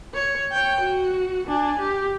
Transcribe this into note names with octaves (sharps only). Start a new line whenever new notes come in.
C#5
C#5 G5
F#4
D4 G#5
G4